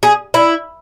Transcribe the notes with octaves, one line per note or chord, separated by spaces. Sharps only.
G#4
E4